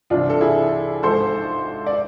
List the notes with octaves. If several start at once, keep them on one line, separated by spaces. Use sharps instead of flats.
C2 C3 E3 D4 F4
A4
E4 G#4
G#1 G#2 F3 A4 C5
D5